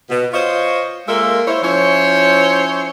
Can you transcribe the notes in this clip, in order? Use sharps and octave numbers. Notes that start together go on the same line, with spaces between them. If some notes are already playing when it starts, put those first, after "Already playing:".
B2
F4 C5 C#5 D#5
G#3 A#3 F4 A4 A#4 E5
E4 C5 C#5
F3 C#4 E4 C5 C#5